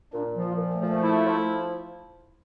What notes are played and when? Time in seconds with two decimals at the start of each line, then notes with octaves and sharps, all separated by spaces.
0.13 A#2 D4
0.36 F3
0.43 F4
0.58 A#2
0.73 A3
0.81 F3
1.03 E4
1.25 F3